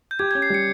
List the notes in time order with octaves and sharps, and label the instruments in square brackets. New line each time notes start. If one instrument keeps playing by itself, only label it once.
[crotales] G6
[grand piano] G4 [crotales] G#6
[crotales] G#6
[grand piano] C#4
[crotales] C7
[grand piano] G3 [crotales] C#7